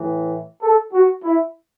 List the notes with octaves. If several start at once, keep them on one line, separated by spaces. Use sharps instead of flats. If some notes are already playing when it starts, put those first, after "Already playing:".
Already playing: A2 E3
A4
F#4
E4